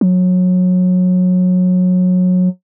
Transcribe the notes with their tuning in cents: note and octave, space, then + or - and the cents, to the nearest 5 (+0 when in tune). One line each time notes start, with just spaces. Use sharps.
F#3 -25